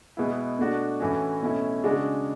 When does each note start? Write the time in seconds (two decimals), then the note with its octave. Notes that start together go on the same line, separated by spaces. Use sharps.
0.17 B2 G#3 B3 E4
0.59 B2 A3 D4 F#4
1.00 A2 E3 A3 C#4 F#4
1.42 B2 A3 C#4 E4
1.84 C#3 G#3 D4 F#4